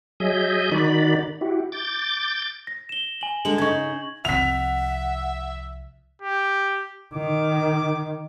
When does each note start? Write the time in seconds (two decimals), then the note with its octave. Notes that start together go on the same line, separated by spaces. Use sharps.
0.20 F#3 G#4 D#5 E5 G#5 G6
0.72 D#3 D#4 F#4 D5 B5
1.41 E4 F#4 G4
1.72 D6 G6 A6
2.67 A#6
2.89 E7 G7
3.21 G#5 F#7
3.45 D3 G#3 F#7
3.58 C#3 D#4 C#6 G#6
4.25 C2 F3 E5 F#5 B6 F7
6.22 G4
7.14 D#3 D6